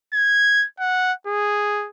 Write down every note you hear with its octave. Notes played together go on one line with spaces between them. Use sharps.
G#6
F#5
G#4